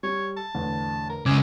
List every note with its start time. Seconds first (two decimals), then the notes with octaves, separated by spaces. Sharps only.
0.03 G3 C#5
0.37 A5
0.55 E2 A2 D3
1.10 A#4
1.26 G1 C#3 G#3 G#5 D6 G#6